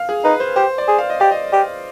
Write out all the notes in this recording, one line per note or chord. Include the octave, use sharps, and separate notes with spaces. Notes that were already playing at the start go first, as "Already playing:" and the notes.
Already playing: F5
G#4
D#4 B4
C5
G4 C5
D5
G#4
F5
D#5
G4 D5
D#5
G4